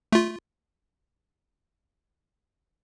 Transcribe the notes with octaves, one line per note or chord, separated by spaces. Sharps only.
A3 F4